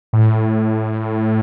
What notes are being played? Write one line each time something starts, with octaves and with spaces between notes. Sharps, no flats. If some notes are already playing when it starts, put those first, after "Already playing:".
A2